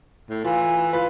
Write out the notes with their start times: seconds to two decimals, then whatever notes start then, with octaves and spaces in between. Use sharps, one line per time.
0.30 A2
0.44 E3 F4
0.93 F4 B4